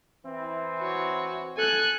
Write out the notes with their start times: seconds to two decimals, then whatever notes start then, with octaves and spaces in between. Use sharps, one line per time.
0.25 E3 C4 E4
0.79 F#4 C#5
1.57 A4 G#5 F#6